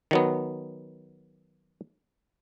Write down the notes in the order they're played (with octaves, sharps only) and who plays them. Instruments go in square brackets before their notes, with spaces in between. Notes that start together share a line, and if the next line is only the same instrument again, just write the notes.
[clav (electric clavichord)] D#3 F#3 B3